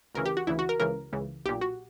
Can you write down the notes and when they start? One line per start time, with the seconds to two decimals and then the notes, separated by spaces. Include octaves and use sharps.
0.15 D2 C#3 E3 A#4
0.25 G4
0.37 F#4
0.47 D2 C#3 E3 E4
0.59 F#4
0.69 A#4
0.80 C#2 C#3 E3 A#4
1.13 C#2 C#3 E3
1.45 B1 G4
1.49 A#2
1.61 F#4